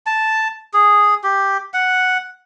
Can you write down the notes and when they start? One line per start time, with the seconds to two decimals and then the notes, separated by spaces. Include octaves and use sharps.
0.06 A5
0.74 G#4
1.24 G4
1.74 F#5